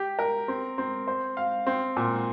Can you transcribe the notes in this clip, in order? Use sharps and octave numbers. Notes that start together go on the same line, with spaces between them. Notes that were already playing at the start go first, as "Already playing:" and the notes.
Already playing: G4
A#4
C4
C4
C5
F5
C4
A#2